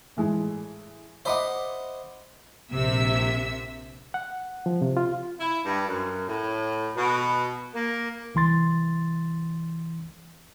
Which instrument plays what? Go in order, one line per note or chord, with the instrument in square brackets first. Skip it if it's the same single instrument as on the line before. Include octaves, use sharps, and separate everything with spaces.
[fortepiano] A2 E3 G#3
[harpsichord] C5 D#5 F#5 [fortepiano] E5 B5 D6
[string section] A#1 C3 E5 E6
[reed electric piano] F#5
F3
C3
F4
[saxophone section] E4
G2
F#2
A2
B2
A#3
[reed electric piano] C2 E3 C6 A6